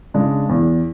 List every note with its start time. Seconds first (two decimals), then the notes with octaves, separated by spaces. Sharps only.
0.14 C#3 G#3 D4
0.49 E2